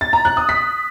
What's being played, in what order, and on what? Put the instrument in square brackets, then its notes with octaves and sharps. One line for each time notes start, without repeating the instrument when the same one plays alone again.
[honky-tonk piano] A6
A#5
F#6
D#6
B6